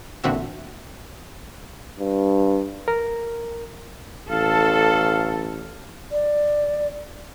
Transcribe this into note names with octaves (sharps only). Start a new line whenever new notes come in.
A1 A#2 D3 C4 F#4 E5
G2
A#4
A1 A4 F5
D5